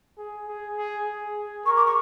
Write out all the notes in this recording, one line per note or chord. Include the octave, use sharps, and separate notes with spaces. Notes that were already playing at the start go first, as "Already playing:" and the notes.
G#4
G#4
G#4
G#4
G#4
A#4 C#6
D6
C#6